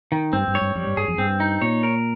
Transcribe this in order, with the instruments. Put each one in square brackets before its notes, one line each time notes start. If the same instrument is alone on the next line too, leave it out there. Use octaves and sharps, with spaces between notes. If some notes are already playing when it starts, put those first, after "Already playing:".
[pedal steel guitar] D#3
[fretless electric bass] G2 [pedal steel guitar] C4
[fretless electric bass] G2
[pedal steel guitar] C#5
[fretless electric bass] G2
[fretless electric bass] F2 [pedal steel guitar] G3
[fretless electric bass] G2
[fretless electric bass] G2 [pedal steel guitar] G#4
[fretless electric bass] F2
[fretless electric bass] G2 [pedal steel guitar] C4
[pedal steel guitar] D#4
[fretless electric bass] A#2 [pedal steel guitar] C#5
[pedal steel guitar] A#4